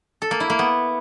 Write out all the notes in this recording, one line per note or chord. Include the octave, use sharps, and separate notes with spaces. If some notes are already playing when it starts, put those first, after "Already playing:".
A4
A#3
E4
A#3
B3